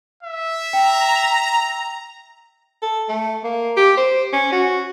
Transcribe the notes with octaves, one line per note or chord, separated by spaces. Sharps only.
E5
G5 A#5
A4
A3
A#3
G4
C5
C#4
F#4